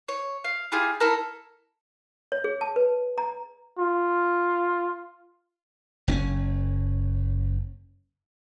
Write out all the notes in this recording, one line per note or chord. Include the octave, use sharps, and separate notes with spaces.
C#5
F5
E4 F4 G4 G#4
E4 A4 A#4
C#5
G#4
A5
B4
A#5
F4
F#1 C4 C#4